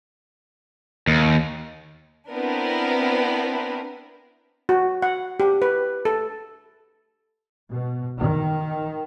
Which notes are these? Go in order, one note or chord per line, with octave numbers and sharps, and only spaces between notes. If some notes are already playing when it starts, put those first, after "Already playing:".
D#2
B3 C4 D4 E4 A#4
F#4
F#5
G4
B4
A4
B2
D#3